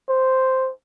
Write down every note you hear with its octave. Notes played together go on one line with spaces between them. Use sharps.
C5